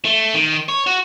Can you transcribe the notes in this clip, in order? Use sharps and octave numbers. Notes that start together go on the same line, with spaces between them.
A3
D#3
C#5
F#4